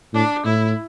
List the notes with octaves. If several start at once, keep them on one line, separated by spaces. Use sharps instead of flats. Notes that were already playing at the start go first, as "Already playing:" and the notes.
A2 D4
A2 E4